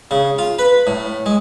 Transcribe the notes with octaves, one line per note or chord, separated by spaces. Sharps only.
C#3
F4
B4
A2
G#3